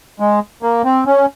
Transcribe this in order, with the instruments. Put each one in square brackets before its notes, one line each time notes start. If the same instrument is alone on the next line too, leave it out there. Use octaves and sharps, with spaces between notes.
[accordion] G#3
A#3
C4
C#4